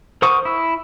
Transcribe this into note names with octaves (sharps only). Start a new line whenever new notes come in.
A#4 C5 F#5 C#6 D#6
E4